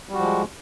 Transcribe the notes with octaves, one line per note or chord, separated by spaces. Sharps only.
F3 G3 G#3 F#4